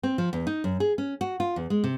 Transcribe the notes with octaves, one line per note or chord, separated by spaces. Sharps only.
C4
F3
E2
D#4
F#2
G#4
C#4
F#4
F4
E2
G#3
C3